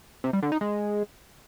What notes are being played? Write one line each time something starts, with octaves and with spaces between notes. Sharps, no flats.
C3
G3
D3
D#4
G#3